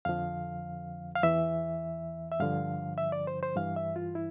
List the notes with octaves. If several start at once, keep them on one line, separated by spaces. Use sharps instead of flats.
F2 D3 F3 F5
F5
E2 E3 E5
E5
G2 D3 F3 F5
E5
D5
C5
C5
G2 E3 F5
E5
F4
E4